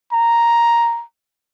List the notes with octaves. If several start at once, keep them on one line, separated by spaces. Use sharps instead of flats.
A#5